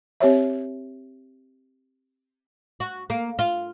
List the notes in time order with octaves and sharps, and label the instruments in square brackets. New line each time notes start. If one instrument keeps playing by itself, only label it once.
[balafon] C4 G4 C#5 E5
[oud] F#4
A#3
F4